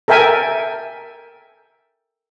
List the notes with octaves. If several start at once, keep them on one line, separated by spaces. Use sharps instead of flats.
A4 A#4 E5 G5 G#5